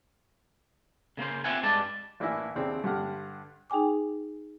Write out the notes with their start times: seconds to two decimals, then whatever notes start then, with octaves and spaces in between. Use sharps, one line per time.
1.17 C#3 A#3 C#4 C5
1.44 C4 F4 E5 F#5 G#5
1.63 G2 G3 G#3 D5 A5
2.20 A1 A#3 D4 E4 G#5
2.55 D#2 C#3 C4 D4 E4
2.84 G2 D3 G4 F#5 F6
3.70 D#4 G#4 G5 G#5 D6